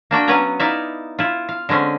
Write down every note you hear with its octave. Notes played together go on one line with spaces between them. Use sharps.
A#3 D4 F#4 G5
F#3 B3 C#4 B4 G#5 A#5
D#4 E4 D5 E5 F5
E4 F4
F5
D3 G#3 C4 C#4